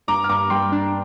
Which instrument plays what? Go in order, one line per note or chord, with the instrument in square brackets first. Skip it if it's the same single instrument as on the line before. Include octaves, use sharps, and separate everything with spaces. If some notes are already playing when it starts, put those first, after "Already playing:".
[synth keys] G2 [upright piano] A#5 D6
[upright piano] F6
[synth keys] G2 [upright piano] A#5 D6
[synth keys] G3 [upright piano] G5 C6
[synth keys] D4